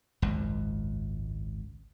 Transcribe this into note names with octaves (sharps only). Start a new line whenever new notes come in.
G#1 C#2 F#2